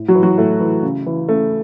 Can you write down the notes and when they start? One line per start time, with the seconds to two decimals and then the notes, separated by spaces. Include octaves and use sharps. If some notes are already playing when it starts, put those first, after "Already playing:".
Already playing: A2
0.08 F#3 F#4
0.15 E3
0.23 F#3 F#4
0.38 A2 A3
0.60 E3
0.83 C#3
1.06 E3
1.28 C#3 A3